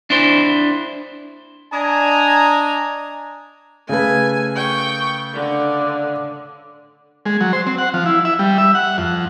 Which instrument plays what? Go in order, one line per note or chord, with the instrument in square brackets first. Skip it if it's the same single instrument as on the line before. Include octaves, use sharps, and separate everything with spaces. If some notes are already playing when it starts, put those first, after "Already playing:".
[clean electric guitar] D4 E4 C5
[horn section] D4 D#5 G#5 A#5
[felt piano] C#3 A3 B4 [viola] G#5
[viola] G5 C#6
D3
[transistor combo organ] G#3
F#3
C5
C4
F#5
F3
E4
E5
G3
E5
F#5
F2